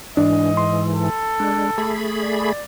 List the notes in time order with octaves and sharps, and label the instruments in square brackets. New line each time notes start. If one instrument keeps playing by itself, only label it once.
[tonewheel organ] G#2 E3 [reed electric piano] D4 [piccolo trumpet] D#5
[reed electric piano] C6
[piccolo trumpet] A4
[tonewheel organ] G#3 D4
A3 G#4 B5
[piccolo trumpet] D5